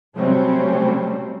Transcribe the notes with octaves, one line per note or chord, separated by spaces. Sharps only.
C3 F#3 G3 A3 C4 C#4